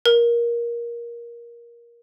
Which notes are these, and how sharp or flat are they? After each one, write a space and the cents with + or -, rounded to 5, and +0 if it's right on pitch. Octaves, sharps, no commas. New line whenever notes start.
A#4 +15